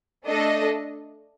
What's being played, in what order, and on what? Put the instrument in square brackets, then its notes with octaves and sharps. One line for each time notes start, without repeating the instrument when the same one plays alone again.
[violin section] A3 D4 A4 D#5